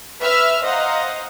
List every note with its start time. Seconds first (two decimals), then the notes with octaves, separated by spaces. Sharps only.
0.21 B4 E5 E6 F6
0.64 C5 D#5 F5 F#5 A#5